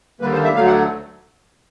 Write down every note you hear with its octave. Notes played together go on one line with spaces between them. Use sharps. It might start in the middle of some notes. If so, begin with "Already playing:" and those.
D#2 D3 G3 A#3 B4
C5
E5
D2 D3 F#3 A3 F5
F#5